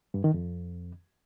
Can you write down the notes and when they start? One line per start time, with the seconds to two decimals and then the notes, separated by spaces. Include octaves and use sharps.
0.14 G2
0.24 D#3
0.34 F2